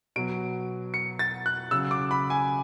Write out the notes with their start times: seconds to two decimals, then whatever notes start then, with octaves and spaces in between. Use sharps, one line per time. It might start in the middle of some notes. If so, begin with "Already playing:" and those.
0.16 B2 F#3 D7
0.94 C#7
1.19 A6
1.46 F#6
1.71 C#3 F#3 E6
1.91 D6
2.11 B5
2.30 G#5